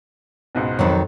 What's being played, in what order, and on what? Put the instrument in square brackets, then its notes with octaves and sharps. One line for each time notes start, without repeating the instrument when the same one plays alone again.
[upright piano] C#2 G#2 B2
[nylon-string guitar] F2 D#3 F#3